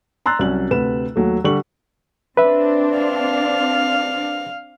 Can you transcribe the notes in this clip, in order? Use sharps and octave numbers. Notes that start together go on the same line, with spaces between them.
A#5 C6 E6 F#6 A6
C2 F#3 C#4 F#7
D2 C3 B4 E7
D#2 F#3 A3
D3 G3 C#6 F#7
C4 D4 B4 E5
F5